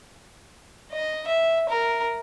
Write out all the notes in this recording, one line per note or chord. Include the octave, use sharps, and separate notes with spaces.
D#5
E5
A#4